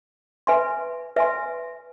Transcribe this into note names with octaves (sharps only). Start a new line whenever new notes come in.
B4 E5 G#5 C6
B4 E5 G#5 C6